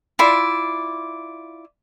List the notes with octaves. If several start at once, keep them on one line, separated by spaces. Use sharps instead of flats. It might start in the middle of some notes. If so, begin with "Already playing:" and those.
E4 F4 D5